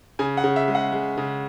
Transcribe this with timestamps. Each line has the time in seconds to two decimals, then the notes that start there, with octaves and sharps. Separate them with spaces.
0.19 C#3 G#5
0.37 F#5
0.44 C#3
0.56 E5
0.68 G#3
0.75 F#5
0.92 G#3
1.18 C#3